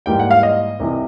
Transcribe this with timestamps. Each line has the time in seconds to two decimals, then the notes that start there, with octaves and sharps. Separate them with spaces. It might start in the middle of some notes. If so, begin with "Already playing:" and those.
0.06 G#2 E3 G3 A#3 G5
0.19 F#5
0.31 F5
0.43 D#5
0.80 C2 C3 E3